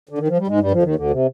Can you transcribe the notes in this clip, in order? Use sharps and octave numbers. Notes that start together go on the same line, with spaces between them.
D3
D#3
F3
G3
G#2 G#3
G2 G3
F2 F3
D#2 D#3
D2 D3
C3